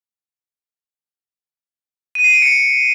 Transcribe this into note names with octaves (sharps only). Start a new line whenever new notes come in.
D#7
C7
D7
C#7